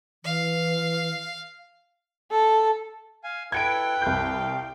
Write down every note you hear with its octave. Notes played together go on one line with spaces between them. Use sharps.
E3 F5
A4
F5 G#5
E4 A4 B4 G5 G#6 C#7 D7
C2 F5 G6